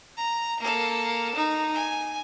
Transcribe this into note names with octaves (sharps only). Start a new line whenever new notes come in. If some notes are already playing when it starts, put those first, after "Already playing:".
A#5
A#3 A4
D#4
G#5